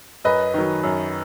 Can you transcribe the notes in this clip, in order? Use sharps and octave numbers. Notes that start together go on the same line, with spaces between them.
F#2 B4 D#5
D#3 F#3
F#2